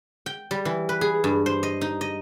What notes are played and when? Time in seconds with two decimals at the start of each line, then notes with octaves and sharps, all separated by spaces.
0.26 G5
0.51 G3
0.65 E3
0.89 B4
1.01 G#4
1.24 G2
1.46 C5
1.63 D#5
1.81 D#4
2.01 D#5